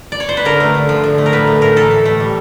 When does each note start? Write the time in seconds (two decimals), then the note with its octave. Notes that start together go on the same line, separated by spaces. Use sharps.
0.12 D5
0.20 C#5
0.29 C5
0.37 B4
0.45 D3 A#4
0.60 A3
0.75 D3
0.89 F3
1.04 D3
1.18 A3
1.26 A#4
1.32 A2 B4
1.47 A3
1.61 A2 A#4
1.76 E3 A4
1.91 A2
2.05 A3
2.20 G3